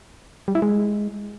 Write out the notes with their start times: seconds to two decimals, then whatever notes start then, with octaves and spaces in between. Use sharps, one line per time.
0.48 G3
0.55 E4
0.62 G#3